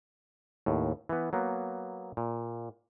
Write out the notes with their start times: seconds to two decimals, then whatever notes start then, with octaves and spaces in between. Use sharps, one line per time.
0.66 D#2 A2
1.09 E3 B3
1.33 F#3 A#3 B3
2.17 A#2